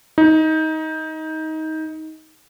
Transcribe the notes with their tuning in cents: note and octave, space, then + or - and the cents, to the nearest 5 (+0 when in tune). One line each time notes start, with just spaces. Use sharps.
D#4 +20